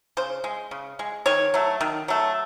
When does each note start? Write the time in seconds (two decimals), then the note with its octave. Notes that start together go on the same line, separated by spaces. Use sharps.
0.17 C#3 C5
0.44 G#3
0.71 C#3
0.99 G#3
1.26 D#3 C#5
1.54 F#3 A3
1.81 D#3
2.08 F#3 A3